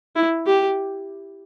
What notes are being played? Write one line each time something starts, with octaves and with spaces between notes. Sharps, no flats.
E4
G4